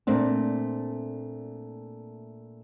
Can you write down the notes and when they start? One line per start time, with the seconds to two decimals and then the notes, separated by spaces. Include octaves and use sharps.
0.07 A#2 A3 C4 D4